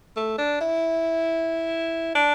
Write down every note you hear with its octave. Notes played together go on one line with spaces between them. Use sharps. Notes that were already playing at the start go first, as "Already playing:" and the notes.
A3
D4
E4
D4